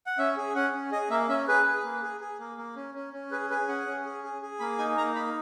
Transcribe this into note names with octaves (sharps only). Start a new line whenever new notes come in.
F#5
C#4 E5
G#4
C#4 F#5
C#4
G#4 D#5
A#3 E5
C#4 E5
G#4 B4
G#4
A#3
G#4
G#4
A#3
A#3
C#4
C#4
C#4
G#4 B4
G#4 B4
C#4 F#5
C#4
G#4
G#4
G#4
A#3 B5
D#4 G#5
A#3 A#5
D#4 B5